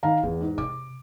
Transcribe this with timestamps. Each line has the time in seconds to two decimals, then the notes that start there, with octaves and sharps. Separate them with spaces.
0.03 D#3 F5 A#5
0.23 E2 A#3
0.41 G#2
0.58 C3 D6